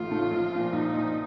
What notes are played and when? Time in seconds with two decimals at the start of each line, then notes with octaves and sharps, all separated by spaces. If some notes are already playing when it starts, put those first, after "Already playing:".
Already playing: A1 A2 A3 D#4 F4
0.10 A2 A3 D#4
0.31 A#1
0.52 A#2 F3
0.73 A#1 D#4
0.93 A#2 F3